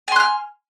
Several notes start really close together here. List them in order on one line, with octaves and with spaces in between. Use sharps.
G#5 C6 F#6 F6